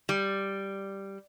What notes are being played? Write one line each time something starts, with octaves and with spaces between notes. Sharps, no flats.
G3